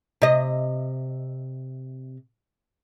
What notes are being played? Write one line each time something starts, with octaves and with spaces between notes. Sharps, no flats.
C3 D#5